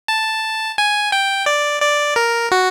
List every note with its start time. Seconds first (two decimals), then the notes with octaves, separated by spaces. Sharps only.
0.08 A5
0.78 G#5
1.12 G5
1.46 D5
1.82 D5
2.16 A#4
2.51 F#4